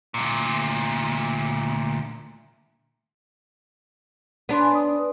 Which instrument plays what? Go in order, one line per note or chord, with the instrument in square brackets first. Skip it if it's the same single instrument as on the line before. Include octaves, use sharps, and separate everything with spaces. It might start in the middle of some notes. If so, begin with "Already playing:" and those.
[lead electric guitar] D2 A#2
[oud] B3 D4 [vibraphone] D5 C6
[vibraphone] G#5
D5 D#6
B4